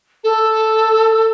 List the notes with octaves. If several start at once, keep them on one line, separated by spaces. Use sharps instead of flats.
A4